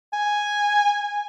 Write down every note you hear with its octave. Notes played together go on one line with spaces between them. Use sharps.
G#5